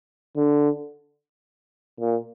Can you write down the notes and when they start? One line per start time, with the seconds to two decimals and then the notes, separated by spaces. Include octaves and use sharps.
0.36 D3
2.00 A#2